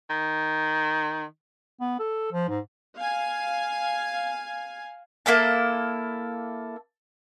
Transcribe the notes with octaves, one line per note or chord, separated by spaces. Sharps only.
D#3
B3
A4
F3
G#2
F5 G#5
A#3 E4 A4 A5